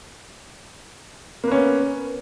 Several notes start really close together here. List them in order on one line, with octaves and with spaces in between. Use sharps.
A#3 B4 C#4 B3